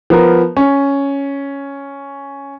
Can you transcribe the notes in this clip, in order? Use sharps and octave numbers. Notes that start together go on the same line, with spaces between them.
F3 B3 A#4
C#4